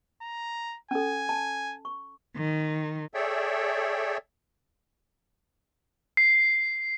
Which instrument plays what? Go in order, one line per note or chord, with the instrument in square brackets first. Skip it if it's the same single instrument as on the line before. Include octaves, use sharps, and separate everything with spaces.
[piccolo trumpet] A#5
[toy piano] C#4 A4 [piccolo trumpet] G#5
[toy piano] A5
C#6
[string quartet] D#3
[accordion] G#4 A4 C#5 D5 E5 G5
[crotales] C7